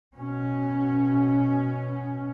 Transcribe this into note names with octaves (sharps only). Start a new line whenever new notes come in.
B2 C#4